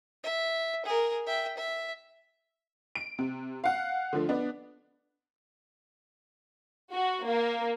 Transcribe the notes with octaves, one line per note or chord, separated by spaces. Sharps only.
E5
G#4 A#4
E5 G5
E5
D7
C3
F5 F#5
D3 F3 A3
B3 D4
F#4
A#3